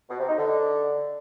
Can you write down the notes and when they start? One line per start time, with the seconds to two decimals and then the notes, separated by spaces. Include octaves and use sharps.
0.09 B2
0.19 C3
0.29 D#4
0.38 D3